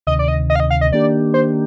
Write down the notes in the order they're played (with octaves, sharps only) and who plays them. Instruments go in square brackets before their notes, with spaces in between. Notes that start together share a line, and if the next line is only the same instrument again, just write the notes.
[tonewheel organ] D2 C3 D#3 [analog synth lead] D#5
[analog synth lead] D5
D#5
D#5
F5
D#5
F5
D#5
[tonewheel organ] D#3 A#3 D4 G4 [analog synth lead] D5
[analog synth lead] C5